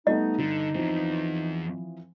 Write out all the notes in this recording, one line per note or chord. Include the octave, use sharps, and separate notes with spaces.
G3 A3 B3 D#4 D#5
G2 D3
E2 E3 F3 C4